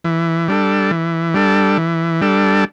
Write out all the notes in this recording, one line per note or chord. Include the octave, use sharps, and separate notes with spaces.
E3
G3 D4 A4
E3
G3 D4 A4
E3
G3 D4 A4